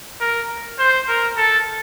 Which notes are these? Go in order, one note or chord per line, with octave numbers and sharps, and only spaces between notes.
A#4
C5
A#4
A4